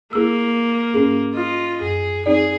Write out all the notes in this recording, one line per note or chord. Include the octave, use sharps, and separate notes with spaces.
A#3 E4 G#4 E6
G#2 C#4 G#4
F4 D#5
F#2 G#4
C4 D#4 G#4 D5